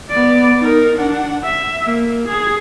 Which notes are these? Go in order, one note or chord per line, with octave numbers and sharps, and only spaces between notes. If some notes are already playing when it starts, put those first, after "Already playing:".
B3 D5
D#4 A#4
D4 F#5
E5
A#3
G#4